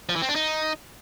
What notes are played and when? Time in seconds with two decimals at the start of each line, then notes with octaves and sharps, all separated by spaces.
0.09 F3
0.16 E3
0.22 C4
0.29 D4
0.35 D#4